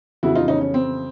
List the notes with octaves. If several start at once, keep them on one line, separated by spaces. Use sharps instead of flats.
F2 C#3 E3 G3 B3 E4 F#4
D#4 F4
C#4 D#4
C#4
C4